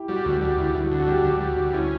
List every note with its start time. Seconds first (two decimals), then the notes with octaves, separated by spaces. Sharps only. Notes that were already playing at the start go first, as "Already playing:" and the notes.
Already playing: E4 G4
0.08 G3 F#4
0.25 D2 F#4
0.41 G3 F#4
0.58 D2 E4
0.74 D2 E4
0.86 F#4
0.91 D3
1.00 F#4
1.07 G3 G4
1.24 D2 F#4
1.41 G3
1.57 D2 F#4
1.73 C#4 E4